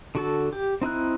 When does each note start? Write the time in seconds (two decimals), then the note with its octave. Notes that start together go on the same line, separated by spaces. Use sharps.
0.15 D3 F#4 A4
0.53 G4
0.82 C4 D#4 E4 F#6